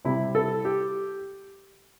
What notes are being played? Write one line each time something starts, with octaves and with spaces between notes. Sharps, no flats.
C3 G3 E4
A4
G4